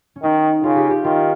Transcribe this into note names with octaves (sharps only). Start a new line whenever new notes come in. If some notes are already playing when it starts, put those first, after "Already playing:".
C#4
D#3 D#4
C#3 F4
G4
G4
D#3 F4